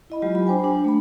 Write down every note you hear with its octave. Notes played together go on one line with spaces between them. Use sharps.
E4 D#5 B5
F#3 G#3 F4 G4
B5
D4 C5 G5 G#5
D4
A3 D4 B5